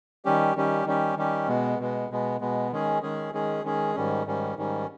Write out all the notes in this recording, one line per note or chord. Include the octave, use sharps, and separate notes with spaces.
D#3 G3 C#4 G4
D#3 G3 C#4 G4
D#3 G3 C#4 G4
D#3 G3 C#4 G4
B2 G#3 B3
B2 G#3 B3
B2 G#3 B3
B2 G#3 B3
D#3 G#3 C#4 G#4
D#3 G#3 C#4 G#4
D#3 G#3 C#4 G#4
D#3 G#3 C#4 G#4
G#2 D#3 G3 C#4
G#2 D#3 G3 C#4
G#2 D#3 G3 C#4